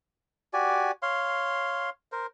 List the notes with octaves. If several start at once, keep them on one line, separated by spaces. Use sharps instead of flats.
F#4 G4 D5 G#5
C#5 F5 C6
A#4 C5